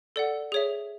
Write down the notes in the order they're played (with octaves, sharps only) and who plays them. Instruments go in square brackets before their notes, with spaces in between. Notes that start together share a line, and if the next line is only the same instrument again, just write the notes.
[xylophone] A4 D5 F#5
G#4 C#5 E5